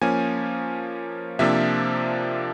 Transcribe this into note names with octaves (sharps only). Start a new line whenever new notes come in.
F3 A#3 C#4 G#5
C3 F3 A#3 D4 E5